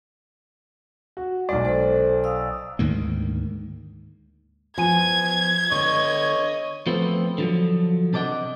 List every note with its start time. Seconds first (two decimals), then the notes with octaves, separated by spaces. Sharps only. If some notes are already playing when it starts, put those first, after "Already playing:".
1.17 F#4
1.49 B1 G#3 D5
1.65 A4 C5
2.24 F5 D#6 E6
2.79 D2 G#2 D#3 A#3
4.78 F3 B3 F4 G#5 G#6 D#7
5.72 D3 B3 C#5 D#5 C#6
6.87 F3 A3 B3 C4
7.38 D3 F3 F#3
8.13 C3 A4 D5 D#5 F#5